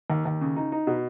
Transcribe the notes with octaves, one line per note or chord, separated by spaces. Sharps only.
D#2
D#2
C#3
D#4
D#4
B2